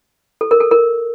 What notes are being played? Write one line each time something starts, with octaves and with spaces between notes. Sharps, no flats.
A4
A#4
A4
A#4